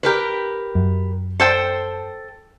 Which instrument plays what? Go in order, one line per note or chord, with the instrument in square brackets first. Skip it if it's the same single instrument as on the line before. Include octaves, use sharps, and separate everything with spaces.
[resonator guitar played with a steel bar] G4 A#4 B4
[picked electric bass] F#2
[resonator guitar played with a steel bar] A4 C5 G5